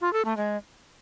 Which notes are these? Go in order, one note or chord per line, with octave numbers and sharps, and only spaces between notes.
F4
A4
A3
G#3